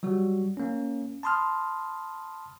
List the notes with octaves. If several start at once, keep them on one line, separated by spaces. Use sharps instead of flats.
F#3 G3 F#4
A#3 C#4
A5 B5 C6 D#6 F6